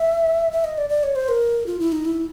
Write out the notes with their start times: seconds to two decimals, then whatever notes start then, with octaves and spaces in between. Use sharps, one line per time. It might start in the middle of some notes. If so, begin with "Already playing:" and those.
Already playing: E5
0.52 E5
0.64 D#5
0.78 D5
0.89 D5
1.03 C#5
1.16 C5
1.29 A#4
1.66 F4
1.80 E4
1.92 D#4
2.05 E4